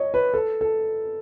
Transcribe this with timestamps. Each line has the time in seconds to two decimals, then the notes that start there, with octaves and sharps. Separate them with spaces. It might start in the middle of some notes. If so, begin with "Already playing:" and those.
Already playing: C#5 D#5
0.14 B4
0.34 A4
0.61 A4